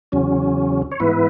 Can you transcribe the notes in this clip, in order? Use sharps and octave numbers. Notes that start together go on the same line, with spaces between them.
E2 C#3 F#3 C#4
C#5
G#2 E3 B3 E4 B4